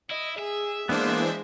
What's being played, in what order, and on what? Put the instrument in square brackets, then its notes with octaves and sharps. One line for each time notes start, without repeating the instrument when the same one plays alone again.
[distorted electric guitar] E4 [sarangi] D#5
[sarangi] G#4 [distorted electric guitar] E5
[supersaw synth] E3 D4 C5 [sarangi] G#3 [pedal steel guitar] A#3 B3